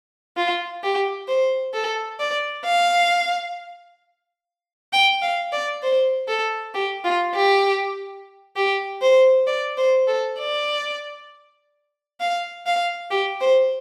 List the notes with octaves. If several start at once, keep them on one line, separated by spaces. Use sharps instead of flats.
F4
G4
C5
A4
D5
F5
G5
F5
D5
C5
A4
G4
F4
G4
G4
C5
D5
C5
A4
D5
F5
F5
G4
C5